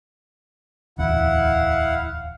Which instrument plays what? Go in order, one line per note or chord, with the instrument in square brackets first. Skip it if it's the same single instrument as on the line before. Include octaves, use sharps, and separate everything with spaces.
[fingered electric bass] D1 E2 [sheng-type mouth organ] E4 F#5 [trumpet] F5